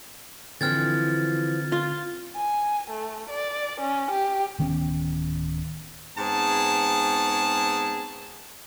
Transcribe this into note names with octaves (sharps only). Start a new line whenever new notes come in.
D3 E3 F3 C4 F6 G#6 A6
F4
G#5
A3
D5
C#4
G4
D1 D#3 B3 C#4
G#2 B3 C4 G#4 A5